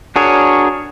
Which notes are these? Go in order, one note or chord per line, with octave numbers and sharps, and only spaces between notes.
D4 F#4 G#4 A#4 C#5